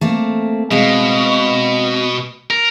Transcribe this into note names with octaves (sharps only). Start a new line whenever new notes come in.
A3 A#3 C4
B2 G#3 C4 F5
A#4